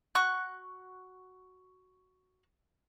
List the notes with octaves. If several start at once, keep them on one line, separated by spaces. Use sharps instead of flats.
F#4 C#6 F#6